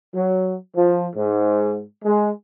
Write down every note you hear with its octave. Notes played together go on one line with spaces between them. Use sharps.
F#3
F3
G#2
G#3